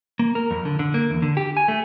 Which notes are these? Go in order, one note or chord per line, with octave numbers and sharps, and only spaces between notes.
A#3
A#4
F2
D3
D3
A#3
E2
D3
G4
G#5
A3